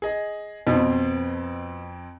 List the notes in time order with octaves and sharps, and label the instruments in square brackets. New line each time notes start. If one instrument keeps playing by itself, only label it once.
[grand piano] G#4 D#5
[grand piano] F2 C4 [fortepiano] B2